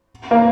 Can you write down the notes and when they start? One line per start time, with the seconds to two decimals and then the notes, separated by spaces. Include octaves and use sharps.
0.31 A#3